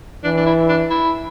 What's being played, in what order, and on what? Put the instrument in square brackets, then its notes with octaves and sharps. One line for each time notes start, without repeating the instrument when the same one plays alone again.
[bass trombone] E3 [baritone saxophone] D4
[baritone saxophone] D4
E4
D4
E4